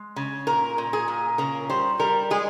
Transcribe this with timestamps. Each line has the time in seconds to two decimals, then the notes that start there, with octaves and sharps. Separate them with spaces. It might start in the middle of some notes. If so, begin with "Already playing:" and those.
Already playing: G#3
0.16 C#3
0.47 A#2 A#4
0.78 A#2
0.93 G#4
1.08 A#2
1.38 C#3 A#4
1.70 G3 C5
2.00 G3 A#4
2.30 G#3 G#4